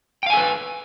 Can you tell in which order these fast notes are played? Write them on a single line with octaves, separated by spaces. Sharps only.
G5 F5 G#5 A4 B4